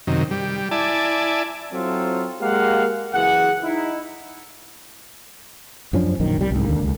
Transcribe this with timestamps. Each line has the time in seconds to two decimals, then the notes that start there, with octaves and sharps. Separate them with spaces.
0.07 F#2 C3 D#3
0.31 G3
0.71 E4 D5 G#5 A5
1.73 F#3 C4 E4 F4 A4
2.41 G#3 A#3 G4 F5 F#5
3.13 F#1 E3 G#4 F#5
3.64 D#4 E4
5.93 F#2 F3 C#4 D4
6.20 A#1 F#2 D#3
6.38 C2 G3
6.51 C2 G#2
6.65 D#2 D3 A#3
6.83 C#2